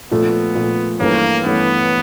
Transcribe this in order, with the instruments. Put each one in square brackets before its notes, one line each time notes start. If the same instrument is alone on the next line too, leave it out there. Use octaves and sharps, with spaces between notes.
[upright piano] A#2 F3 A3 [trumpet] B3
[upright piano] A#2 F3 A3
[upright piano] G2 E3 A3 C#4 [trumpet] A#3
[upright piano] G2 E3 A3 C#4 [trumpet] B3